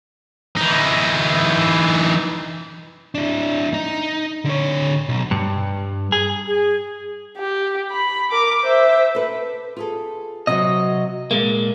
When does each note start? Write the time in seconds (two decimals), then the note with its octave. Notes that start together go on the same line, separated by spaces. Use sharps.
0.57 E3 D#4
3.15 D4 E4
3.74 D#4
4.45 D3 C#5
5.09 B1
5.31 G2
6.12 G#4
6.47 G#4
7.38 G4
7.91 B5
8.32 A#4 D6
8.62 C5 E5
9.15 A4 B4
9.77 F4 G#4 A4
10.47 C3 F#3 F#4 D#5
11.31 A#2 G#3 A#3 F5